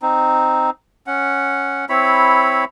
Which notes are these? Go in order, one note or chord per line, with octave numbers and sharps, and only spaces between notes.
C4 D#4
C#4 F#5
C4 E4 C#5 B5